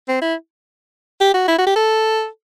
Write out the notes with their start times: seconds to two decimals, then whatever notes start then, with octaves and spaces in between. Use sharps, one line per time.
0.08 C4
0.22 E4
1.21 G4
1.34 F#4
1.48 E4
1.58 F#4
1.67 G4
1.76 A4